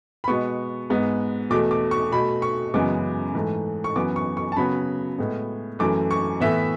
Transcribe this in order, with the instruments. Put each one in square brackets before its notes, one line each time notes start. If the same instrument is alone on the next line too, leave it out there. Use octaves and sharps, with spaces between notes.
[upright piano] B5
B2 G#3 B3 C#6
G#2 G#3 B3
E2 B2 A3 D6
D6
C#6
B2 A3 B5
C#6
F#2 C#3 E3 G#3 B3 D6
G#2 E3 A3
C#6
F#2 E3 B3 D6
C#6
C#6
A5
C#3 F#3 B3 B5
A2 G#3 B3
F#2 E3 A3 D6
C#6
A2 E3 B3 E5